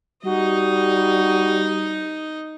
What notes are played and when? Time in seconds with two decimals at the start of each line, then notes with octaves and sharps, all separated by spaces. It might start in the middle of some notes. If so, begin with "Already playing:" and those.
0.25 G3 D#4 F#4 D#5